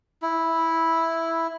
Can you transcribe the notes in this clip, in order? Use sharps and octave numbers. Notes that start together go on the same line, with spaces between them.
E4